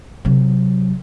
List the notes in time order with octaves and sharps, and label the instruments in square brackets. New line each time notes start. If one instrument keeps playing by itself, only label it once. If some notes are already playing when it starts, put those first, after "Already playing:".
[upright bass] C3 F#3